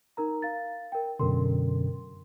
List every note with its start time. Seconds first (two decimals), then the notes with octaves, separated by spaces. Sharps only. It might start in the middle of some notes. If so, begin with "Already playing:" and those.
0.17 D#4 A#4 A#5
0.42 F5 A6
0.92 A#4 G5
1.19 F#2 B2 D3 A#4 C6